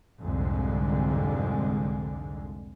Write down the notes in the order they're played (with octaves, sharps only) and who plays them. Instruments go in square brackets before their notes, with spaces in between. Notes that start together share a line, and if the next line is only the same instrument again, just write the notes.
[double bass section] C2 F2 G#2 D3 G#3